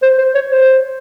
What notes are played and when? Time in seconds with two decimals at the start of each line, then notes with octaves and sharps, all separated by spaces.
0.03 C5
0.18 C5
0.35 C#5
0.51 C5